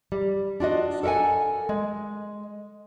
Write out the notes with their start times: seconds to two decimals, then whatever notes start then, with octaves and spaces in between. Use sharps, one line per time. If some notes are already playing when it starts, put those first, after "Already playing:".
0.12 G3
0.60 D4 F4 F#4 D#5
1.03 A4 A#4 E5 F#5 G#5
1.69 G#3